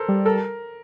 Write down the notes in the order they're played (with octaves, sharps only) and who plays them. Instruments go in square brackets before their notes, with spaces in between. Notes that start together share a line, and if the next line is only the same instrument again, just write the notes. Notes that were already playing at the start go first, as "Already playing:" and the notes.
Already playing: [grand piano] A4 A#4 C5
[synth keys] G3
[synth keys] A4 [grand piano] A#4